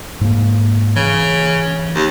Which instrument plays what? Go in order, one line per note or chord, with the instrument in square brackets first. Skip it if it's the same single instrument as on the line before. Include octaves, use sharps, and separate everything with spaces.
[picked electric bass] G#2 A#3
[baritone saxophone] C#3 [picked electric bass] E3
[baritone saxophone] D#2